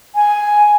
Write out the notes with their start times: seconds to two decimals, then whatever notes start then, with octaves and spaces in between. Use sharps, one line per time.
0.15 G#5